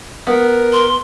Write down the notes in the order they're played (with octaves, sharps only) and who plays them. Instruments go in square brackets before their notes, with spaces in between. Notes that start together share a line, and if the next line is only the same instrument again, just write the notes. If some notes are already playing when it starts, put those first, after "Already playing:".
[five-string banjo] B3 [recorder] A#4
[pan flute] C6